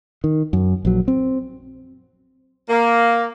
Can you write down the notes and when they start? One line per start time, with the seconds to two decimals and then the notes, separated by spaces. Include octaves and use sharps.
0.24 D#3
0.53 F#2
0.85 A#1 F#3
1.08 C4
2.69 A#3